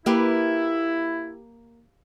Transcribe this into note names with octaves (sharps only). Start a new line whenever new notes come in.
A#3 E4 G4 B4